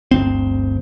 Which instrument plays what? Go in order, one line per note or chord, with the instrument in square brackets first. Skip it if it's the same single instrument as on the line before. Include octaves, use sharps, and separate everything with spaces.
[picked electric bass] G1 D2 C4